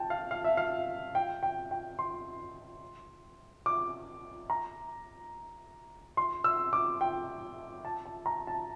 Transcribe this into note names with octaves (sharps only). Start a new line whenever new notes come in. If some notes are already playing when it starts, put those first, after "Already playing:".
Already playing: G5 A5
F5
F5
E5
F5
G5
G5
G5
C6
D6
A#5
C6
E6
D6
G5
A5
A5
A#5
A5